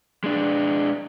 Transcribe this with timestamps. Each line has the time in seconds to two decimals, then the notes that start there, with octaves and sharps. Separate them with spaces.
0.24 G#3 D4